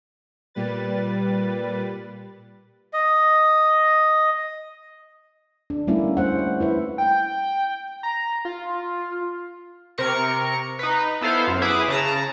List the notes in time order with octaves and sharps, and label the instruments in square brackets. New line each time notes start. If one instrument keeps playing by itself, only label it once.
[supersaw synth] A#2 G3 B4 A6
[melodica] D#5
[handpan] D4
G3 A3 A#3 C#4 E4
A#3 C5 F#5
C#5
E4 B4 E5
[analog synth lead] G5
A#5
F4
[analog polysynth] C3 A#4 C#6 C#7
D#4 B4
B3 E4 A4 C5 F5
F#2
E4 G#4 B4 D6 D#6
C#3 A5 A#5